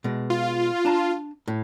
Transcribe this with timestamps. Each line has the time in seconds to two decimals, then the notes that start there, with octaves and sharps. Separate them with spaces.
0.04 B2 G#3
0.30 F4
0.85 D4 A5 A#5
1.48 A2